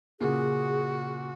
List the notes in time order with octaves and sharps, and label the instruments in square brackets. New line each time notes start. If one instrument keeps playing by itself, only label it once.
[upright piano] A#2 C#3 [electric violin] F#4 [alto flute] G#4